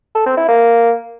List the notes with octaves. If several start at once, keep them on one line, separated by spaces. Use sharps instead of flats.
A4
C4
E4
A#3